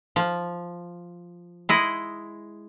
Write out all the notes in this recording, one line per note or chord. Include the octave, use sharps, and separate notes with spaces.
F3
G#3 E4 D#5